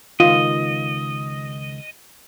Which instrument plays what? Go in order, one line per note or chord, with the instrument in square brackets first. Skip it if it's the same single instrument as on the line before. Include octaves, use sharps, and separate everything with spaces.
[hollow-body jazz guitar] C#2 D#3 [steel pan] F4 [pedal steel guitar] D#5